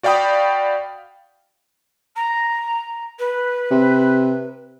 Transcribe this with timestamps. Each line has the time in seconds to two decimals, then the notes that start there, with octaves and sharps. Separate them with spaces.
0.03 F#4 D5 F5 G5 B5 D#6
2.15 A#5
3.18 B4
3.71 C3